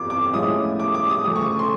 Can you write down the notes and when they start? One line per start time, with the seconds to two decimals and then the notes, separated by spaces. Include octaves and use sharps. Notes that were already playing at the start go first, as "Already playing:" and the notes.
Already playing: G1 F2 C3 E3 D6
0.10 D6
0.33 A2 F3 G#3 C#4 E4 D#6
0.80 D6
0.94 D6
1.10 D#6
1.24 D2 C#3 F3 A3 D#6
1.36 C#6
1.59 C6